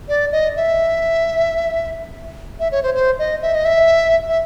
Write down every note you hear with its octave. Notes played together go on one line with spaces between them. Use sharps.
D5
D#5
E5
E5
C#5
C5
C5
D#5
E5
D#5
E5
E5